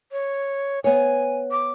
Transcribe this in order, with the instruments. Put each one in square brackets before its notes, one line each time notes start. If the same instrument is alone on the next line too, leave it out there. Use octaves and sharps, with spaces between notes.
[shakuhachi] C#5
[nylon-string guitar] B3 C#5 [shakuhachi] G#5
[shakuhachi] D6